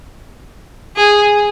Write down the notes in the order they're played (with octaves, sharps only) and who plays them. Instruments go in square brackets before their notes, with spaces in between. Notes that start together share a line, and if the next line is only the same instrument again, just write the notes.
[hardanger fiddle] G#4